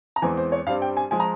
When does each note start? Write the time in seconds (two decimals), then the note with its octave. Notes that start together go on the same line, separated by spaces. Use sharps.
0.16 A#5
0.22 E2 E3 G#3 C4 G#5
0.37 C5
0.52 C#5
0.66 G2 G3 C4 F5
0.82 G5
0.97 G#5
1.11 F3 G#3 G#5
1.20 A#5